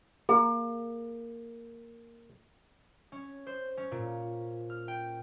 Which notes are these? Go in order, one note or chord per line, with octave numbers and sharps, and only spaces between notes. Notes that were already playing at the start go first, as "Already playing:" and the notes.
A#3 G#4
C#4
C5
C#4
A#2
F6
G5